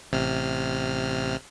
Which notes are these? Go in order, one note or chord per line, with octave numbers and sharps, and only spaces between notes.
A1 C3 F6